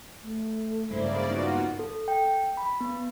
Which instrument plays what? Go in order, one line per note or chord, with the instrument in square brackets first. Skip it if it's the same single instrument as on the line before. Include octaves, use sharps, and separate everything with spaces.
[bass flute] A3
[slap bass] G2 G#3 [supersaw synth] C#3 A#3 D5 [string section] E4 C5
[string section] B3 F#4 [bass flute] D#4 [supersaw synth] F4
[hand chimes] A4
G5
B5
B3